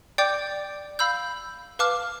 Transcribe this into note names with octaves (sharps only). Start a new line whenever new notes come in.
D5 G5 D6 G6
F5 B5 E6 G6
B4 F5 A5 D6 F6